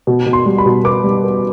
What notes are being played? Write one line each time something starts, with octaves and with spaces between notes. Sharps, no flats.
B2
B2
C6
G3
B5
B2
B3 D6
G3
B3